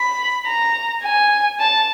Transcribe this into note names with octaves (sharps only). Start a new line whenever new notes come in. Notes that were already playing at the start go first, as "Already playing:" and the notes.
Already playing: B5
A#5
G#5
A5